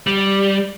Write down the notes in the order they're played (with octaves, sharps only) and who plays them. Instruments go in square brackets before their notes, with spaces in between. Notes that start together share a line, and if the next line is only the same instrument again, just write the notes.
[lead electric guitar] G3